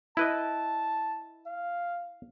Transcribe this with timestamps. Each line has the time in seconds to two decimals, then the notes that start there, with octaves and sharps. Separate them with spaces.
0.17 E4 B4 D#5 A5
1.46 F5